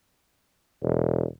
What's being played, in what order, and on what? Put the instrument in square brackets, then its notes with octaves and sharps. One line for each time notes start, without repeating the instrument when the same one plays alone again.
[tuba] E1